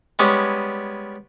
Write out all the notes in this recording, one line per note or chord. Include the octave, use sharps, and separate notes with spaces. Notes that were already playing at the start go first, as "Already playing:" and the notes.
G3 G#3 B3 C#4